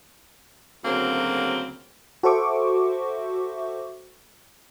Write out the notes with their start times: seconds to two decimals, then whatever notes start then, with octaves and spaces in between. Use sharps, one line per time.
0.84 D2 C#3 F#3 A#3 C4
2.23 F#4 A4 C5 E5 C#6 D6